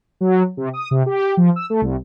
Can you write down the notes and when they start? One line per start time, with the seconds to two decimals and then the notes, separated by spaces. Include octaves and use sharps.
0.21 F#3
0.57 C3
0.73 D#6
0.91 C3
1.06 G4
1.37 F3
1.56 E6
1.70 A3
1.81 C2